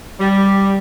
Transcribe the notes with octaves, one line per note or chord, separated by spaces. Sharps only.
G3